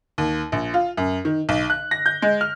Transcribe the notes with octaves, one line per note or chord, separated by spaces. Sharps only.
D#2
A#1
F4
F#2
D#3
B1
F#6
A#6
G6
G#3
F6